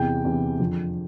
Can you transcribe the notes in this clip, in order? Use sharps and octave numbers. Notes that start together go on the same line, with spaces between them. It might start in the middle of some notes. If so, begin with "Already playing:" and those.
Already playing: E2 C3 E3 G5
E2 C3 E3
F2 D3 F3